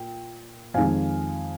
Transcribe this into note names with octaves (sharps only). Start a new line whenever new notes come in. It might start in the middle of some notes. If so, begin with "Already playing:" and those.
Already playing: A#2 G5
F2 D#3 G#3 F5 G#5